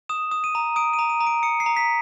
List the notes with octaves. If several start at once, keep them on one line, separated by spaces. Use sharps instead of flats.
D#6 E7
D#6
D#7
A#5
D#6 D7
D#7
A#5
D#7
A#5
D7
D#6 C#7
C7
A#5
B6